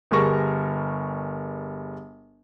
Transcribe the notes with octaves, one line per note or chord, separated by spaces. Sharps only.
G1 G3 G#4 A#4 C#6 A#6